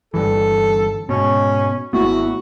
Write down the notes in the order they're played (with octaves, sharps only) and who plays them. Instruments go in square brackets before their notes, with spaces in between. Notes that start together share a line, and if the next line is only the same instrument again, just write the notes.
[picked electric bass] G1 G2 E3 [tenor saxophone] A4
[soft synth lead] G#2 [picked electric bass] B2 [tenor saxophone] C#4
[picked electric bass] G#1 A3 B3 [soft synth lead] E4 [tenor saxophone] F#4